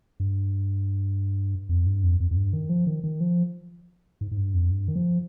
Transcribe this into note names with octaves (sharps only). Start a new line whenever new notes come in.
G2
F2
G2
F2
F2
F2
G2
D#3
F3
D#3
D#3
F3
G#2
G#2
G2
F2
G2
D#3
F3